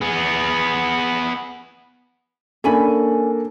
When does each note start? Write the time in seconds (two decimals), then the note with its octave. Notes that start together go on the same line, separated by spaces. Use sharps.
0.01 B3 G#4
2.64 A#3 C#4 D4 A4 G#5 B5